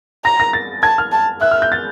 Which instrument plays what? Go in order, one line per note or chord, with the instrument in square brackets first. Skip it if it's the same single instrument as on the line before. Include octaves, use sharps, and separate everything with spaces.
[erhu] A#5 [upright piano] A#6
[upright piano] A#6
A6
[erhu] A5 [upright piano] G#6
[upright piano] F6
[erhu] A5
[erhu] E5 [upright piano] F#6
[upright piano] F6
G6
A6